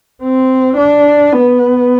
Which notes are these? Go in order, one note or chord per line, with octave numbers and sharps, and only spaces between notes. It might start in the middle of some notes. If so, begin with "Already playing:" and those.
C4
D4
B3